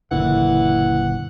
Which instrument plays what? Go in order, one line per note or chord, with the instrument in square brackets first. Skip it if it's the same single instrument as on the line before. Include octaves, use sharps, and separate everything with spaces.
[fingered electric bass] F#1 A#2 D3 [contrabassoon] E3 [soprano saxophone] F#5